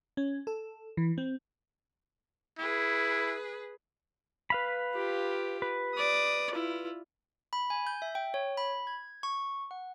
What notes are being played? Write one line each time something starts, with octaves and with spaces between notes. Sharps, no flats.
C#4
A4
E3
C4
E4 G#4 B4
B4 F5 B5
F4 G4
B4
D5 D#6
E4 F4
B5
G#5
G6
E5
G5
C#5
B5
G#6
C#6
F#5